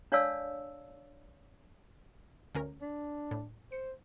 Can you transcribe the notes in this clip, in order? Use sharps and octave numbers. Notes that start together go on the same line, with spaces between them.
D4 C#5 D5 F5 A5 E6
D2 C#4 A#4
D4
A2
C5 C#7